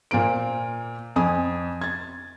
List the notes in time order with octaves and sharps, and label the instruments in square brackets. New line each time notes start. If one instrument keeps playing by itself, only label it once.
[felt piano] A#2 A#3 C5 D7
F2 G#5 D#6
G#6 A6